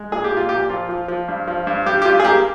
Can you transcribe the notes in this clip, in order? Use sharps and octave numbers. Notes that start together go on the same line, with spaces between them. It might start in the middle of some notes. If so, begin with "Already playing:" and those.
Already playing: G#3
A#2 G#4
G4
A#2
F4
A#2 G4
F3 F4
F3
F3
G2
F3
G2
G2 G4
G4
G2 F4
G#4
A#3 G4